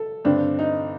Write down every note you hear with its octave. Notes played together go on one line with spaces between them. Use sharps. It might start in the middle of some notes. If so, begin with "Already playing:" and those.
Already playing: A4
G2 D3 A3 C4 D4
D#4